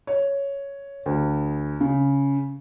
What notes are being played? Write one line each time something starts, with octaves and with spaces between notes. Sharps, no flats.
C#5
D2
C#3